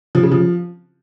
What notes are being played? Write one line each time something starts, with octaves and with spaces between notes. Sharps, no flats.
F3
C#3
F3